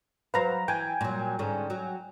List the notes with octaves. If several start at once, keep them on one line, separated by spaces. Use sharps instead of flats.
F#3 B4 C5 F5 A#5
E3 G5 G#5
A#2 F#3
G#2 D3 C#4
F#3